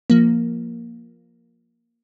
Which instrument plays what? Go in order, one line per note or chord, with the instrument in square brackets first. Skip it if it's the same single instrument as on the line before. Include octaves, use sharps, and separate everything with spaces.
[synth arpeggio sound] F3 A#3